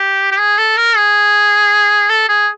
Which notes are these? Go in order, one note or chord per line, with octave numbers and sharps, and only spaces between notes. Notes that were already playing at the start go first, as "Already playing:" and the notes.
Already playing: G4
G4
G#4
A4
A#4
G#4
A4
G#4